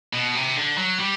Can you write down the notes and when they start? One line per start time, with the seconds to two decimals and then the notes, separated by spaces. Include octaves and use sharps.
0.13 B2
0.35 C3
0.57 D3
0.78 F#3
0.99 G3